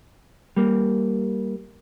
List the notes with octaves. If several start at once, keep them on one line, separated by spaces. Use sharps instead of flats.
G3 A#3